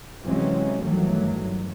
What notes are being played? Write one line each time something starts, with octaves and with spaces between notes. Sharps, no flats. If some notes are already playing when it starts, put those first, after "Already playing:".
C3 E3 F#3 G#3 C4 C#4
G1 D#3 E3 F#3 G3 A3